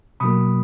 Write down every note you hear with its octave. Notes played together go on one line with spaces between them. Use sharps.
B2 F#3 A#3 B5 D#6